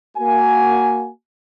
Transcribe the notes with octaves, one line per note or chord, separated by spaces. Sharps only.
A#3 F#4 G#5